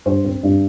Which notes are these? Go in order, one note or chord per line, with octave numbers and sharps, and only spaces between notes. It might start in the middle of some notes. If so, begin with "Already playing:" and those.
G2 C5
C4
G2